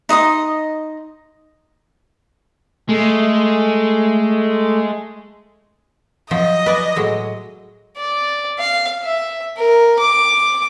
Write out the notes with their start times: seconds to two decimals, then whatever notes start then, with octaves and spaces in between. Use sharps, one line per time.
0.09 D#4 D#5 C6 D#6
2.89 G#3 A3
6.31 F3 F#3 C5 D#5
6.66 B4 D5 G#5
6.96 A2 F#3 G#3
7.98 D5
8.59 F5
9.03 E5
9.57 A#4
9.99 D6